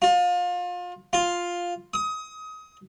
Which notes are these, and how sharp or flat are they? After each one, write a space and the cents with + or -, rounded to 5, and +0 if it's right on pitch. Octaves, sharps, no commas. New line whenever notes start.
F4 +30
F4 +5
D#6 +25